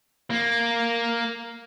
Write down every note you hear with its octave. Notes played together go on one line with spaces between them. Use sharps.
A#3